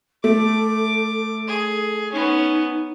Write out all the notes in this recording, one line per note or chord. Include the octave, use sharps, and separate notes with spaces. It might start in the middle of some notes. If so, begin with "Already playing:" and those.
A3 A4 D6
G#4
B3 C#4 D#4